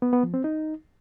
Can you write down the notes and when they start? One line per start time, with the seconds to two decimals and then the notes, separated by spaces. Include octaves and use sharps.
0.02 B3
0.13 B3
0.23 F3
0.34 C4
0.44 D#4